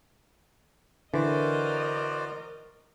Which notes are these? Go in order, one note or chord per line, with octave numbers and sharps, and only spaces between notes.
D3 E3 F#4 A#4 C5 D5 D#5